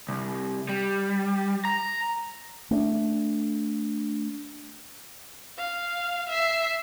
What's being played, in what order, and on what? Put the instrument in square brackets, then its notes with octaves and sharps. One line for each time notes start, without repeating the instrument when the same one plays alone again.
[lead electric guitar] C2
G3
A#5
[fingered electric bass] A3 D4
[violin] F5
E5 C7